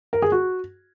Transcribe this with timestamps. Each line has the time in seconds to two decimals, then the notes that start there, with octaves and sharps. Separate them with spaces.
0.13 A#4
0.22 G#4
0.32 F#4